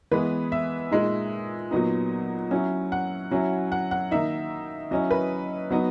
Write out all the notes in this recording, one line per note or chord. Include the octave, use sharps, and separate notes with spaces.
E3 G#3 B3 B4
E5
A#2 G#3 D#4
A#2 F#3 B3 D#4
F#3 C#4 E4
F#5
F#3 C#4 E4
F#5
F#5
D#3 A#3 D#4 E5
F#3 C#4 E4 D#5
B4
F#3 B3 D#4